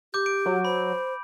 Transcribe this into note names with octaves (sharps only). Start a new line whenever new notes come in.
G4 D6 G6
D7
F#3
C5 B5